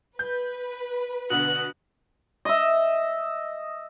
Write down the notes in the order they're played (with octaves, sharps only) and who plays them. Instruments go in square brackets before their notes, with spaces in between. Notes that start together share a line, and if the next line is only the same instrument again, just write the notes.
[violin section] B4 [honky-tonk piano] G6
[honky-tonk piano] B2 D3 B3 [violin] F#6
[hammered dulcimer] D#5 E5